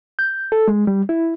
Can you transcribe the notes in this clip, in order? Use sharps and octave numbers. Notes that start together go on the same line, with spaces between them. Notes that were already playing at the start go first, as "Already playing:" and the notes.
G6
A4
G#3
G3
E4